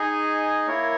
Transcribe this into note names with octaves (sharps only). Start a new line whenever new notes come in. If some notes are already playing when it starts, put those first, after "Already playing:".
Already playing: D#4 G#4 D#5 G#5
A#3 E4 A#4 C#5